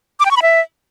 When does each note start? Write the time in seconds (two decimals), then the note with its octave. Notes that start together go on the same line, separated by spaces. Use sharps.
0.20 D6
0.25 G5
0.31 C#6
0.37 B5
0.42 E5